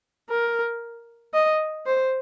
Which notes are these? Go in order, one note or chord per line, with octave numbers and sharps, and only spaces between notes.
A#4
D#5
C5